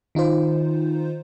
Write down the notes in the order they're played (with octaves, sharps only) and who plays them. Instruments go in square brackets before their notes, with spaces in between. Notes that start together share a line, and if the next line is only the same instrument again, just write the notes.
[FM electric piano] D#3 D#4 F4 C5